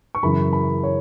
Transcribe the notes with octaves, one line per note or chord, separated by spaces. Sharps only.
C#6
F#2 C#3 E3 B5
B5
C#5